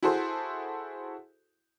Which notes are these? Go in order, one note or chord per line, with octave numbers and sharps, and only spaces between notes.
E4 F#4 G#4 A4 C5